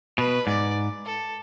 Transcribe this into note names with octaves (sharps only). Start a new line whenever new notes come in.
B2 B4
G#2 D5
A4